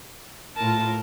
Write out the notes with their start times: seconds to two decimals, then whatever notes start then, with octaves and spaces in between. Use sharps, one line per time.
0.56 A2 F4 A#4 A5